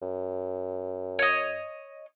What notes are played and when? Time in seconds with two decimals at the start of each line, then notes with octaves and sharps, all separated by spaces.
0.02 F#2
1.19 C#5 D#5